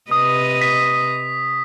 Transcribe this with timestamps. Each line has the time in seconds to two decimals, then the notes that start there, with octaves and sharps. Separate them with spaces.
0.11 C3 B4 D#5 D#6
0.61 B6